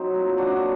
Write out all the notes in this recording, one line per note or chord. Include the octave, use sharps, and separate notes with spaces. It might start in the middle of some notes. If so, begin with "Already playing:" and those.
Already playing: F#3 C4 D#4
A#2
F#3 D4 F#4